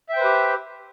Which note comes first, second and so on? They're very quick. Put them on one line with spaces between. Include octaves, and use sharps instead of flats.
E5 G5 C5 B4 G4